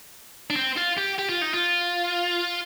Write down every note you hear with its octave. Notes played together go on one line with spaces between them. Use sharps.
D4
C4
F4
G4
G4
F4
D#4
F4